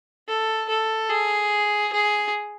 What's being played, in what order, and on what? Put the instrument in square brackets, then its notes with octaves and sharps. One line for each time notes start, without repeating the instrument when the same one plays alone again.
[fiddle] A4
A4
G#4
G#4